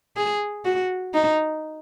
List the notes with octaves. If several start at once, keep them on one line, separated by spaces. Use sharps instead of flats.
G#4
F#4
D#4